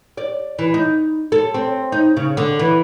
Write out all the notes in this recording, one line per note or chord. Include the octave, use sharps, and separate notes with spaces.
D5
E3
D#4
A4
C4
D#4
C#3
D3
E3